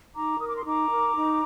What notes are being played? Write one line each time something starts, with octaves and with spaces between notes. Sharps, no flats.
D#4 A#5 D6
A#4 D#6
D6
C6
D#4 A#5 D6
A#4
D#4